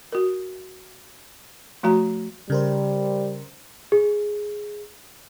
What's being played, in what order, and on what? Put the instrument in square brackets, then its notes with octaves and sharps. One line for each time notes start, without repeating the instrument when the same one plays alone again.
[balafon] F#4 A#4
F3 A3 F#4 A#5
[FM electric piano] C#3 A#4 C5 [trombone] G3
[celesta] G#4